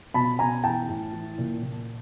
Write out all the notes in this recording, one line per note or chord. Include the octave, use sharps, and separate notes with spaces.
B2 A5 B5
B2 G#5 A#5
E3 G5 A5
A2
E3
A#2
A#2